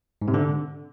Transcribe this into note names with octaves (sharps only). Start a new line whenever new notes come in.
G#2
C3
D3